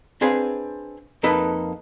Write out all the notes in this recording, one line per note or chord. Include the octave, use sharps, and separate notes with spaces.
C4 D4 G#4 B4 F5
F2 A#3 D#4 A4 B4